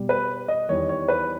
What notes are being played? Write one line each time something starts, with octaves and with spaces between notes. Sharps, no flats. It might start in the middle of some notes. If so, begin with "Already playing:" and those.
Already playing: B2 G3
B4
D#5
E2 D#3 G3 C#5
C#5
B4